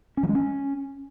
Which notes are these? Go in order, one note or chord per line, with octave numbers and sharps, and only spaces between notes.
C#4
F3
G#3
C#4